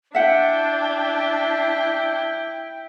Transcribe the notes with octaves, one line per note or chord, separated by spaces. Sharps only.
D4 E4 E5 F#5 G5